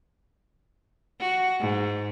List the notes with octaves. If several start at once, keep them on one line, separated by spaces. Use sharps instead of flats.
F#4
G#2